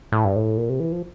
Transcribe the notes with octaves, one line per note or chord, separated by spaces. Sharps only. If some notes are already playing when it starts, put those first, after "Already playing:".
A2
G2
A2
A#2
C3
E3
F3